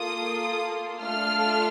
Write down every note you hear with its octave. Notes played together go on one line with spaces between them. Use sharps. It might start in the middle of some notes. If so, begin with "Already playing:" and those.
Already playing: A#3 F4 A4 D#6
A3 D4 F4 A4 F6